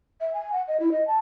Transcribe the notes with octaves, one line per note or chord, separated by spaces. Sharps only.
E5
G#5
F#5
D#5
E4
D#5
A5